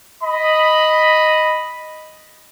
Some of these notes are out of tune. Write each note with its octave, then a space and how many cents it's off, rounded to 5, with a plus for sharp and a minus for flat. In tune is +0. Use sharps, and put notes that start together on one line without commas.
D#5 +0 B5 +0